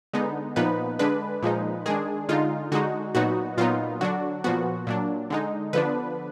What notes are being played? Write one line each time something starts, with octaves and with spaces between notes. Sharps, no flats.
D3 G#3 B3 D#4
A#2 F3 B3 D#4 B4
D3 G#3 D4 B4
A#2 F3 G#3 D#4
D#3 G#3 D4 G#4
D3 G#3 D#4 F4
D3 G#3 D#4 F#4
A#2 F#3 B3 D#4 F#4
A#2 F#3 B3 D#4 F4
D3 F#3 D4 F#4
A#2 F3 B3 F#4
A#2 F#3 D4
D3 G#3 D#4
D3 F3 B3 D4 B4